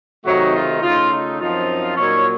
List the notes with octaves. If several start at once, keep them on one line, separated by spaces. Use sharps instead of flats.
C3 D#3 F#3 A3 D#4 F#4
F4
C#3 A3 D#4 F4
D#4
F#2 F3 C4 D#4 F4
A#2 F#3 A#3 C#4 D#4 C#5